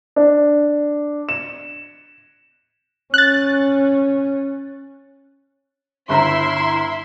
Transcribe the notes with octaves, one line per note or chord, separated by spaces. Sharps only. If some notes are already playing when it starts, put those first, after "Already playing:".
D4
E7
C#4 F#6 A6
G1 E4 E5 A#5 C6